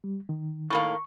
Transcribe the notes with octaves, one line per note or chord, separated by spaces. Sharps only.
G3
D#3
A2 D#3 A#3 C#6